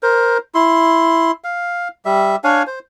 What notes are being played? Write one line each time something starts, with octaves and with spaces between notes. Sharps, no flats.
A#4 C5
E4 C6
F5
G3 E5
D4 C#5 F5 G#5
C5